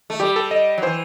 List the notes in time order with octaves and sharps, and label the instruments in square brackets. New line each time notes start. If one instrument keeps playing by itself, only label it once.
[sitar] A3
[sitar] G3 [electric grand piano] G4
[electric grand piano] A4
D#5
[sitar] F#3
[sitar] E3 [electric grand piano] C5